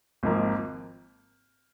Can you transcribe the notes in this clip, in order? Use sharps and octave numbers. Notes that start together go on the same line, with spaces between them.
G#1 G#2 F3 A#3